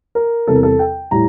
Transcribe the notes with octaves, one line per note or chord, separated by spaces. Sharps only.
A#4
E2 C3 G3 A4
A#4
A4
G5
A2 G3 A#5